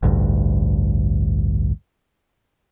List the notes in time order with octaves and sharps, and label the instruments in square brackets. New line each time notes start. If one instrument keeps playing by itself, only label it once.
[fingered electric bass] A1 D2 G2